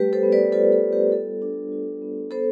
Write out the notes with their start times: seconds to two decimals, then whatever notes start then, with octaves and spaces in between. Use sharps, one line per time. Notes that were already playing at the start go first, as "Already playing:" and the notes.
Already playing: G3 A3 G4 B4
0.13 A4 C5
0.23 B3
0.32 B4 D5
0.52 F4 A4 C5
0.72 A4 C5
0.82 G3
0.93 G4 B4
1.12 B3 A4
1.42 D4
1.72 F4
2.02 B3
2.31 B3 A4 C5